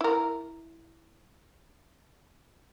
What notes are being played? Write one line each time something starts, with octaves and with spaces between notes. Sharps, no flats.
E4 A#4